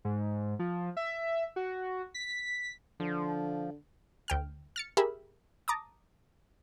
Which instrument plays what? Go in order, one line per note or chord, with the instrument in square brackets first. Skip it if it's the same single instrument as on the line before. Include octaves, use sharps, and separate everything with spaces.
[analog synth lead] G#2
F3
E5
F#4
B6
[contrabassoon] D3 [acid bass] F3
[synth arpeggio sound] D2 G5 F6
F6 A6 C#7
G4 G#4 A#4 E5 B5
A5 A#5 D6 D#6